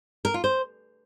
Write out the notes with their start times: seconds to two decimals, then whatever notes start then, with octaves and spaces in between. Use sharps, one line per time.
0.25 A#4
0.34 F4
0.44 C5